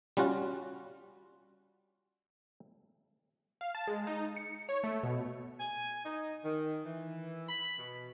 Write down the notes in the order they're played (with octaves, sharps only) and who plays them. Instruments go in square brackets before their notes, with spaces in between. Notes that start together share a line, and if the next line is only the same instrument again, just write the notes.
[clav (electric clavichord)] G3 C#4 F4 F#4
[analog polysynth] F5
A5
G#3
D#4
C#7
C#5
A3
B2
[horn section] G#5
D#4
D#3
E3
B5
B2